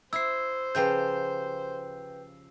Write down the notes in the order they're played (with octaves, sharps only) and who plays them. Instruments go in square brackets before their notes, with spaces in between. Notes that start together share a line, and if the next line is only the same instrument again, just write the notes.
[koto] E4 [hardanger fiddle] C5 [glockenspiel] E6 C7
[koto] C#3 F3 G4 [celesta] B4 G5 G6